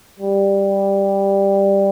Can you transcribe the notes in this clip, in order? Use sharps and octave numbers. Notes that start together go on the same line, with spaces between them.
G3